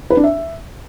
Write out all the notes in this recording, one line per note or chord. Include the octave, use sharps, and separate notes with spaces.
B4
D4
E5